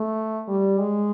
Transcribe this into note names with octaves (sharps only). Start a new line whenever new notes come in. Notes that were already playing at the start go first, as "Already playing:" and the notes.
Already playing: A3
G3
G#3